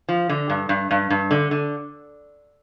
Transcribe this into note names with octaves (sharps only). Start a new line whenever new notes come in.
F3
D3
G2
G2
G2
G2
D3
D3